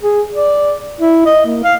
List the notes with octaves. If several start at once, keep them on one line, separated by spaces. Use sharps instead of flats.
G#4
D5
E4
D#5
A#3
F5